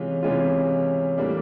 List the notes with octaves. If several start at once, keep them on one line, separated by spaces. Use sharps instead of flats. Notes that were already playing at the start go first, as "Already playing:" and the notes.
Already playing: C3 E3 G#3 C#4 F4
C3 E3 G#3 C#4 F4
A2 E3 G3 A#3 D4